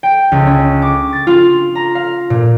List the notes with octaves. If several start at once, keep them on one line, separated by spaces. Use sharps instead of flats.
G5
C#2
C#4
D6
A6
F4
A#5
F5
A#2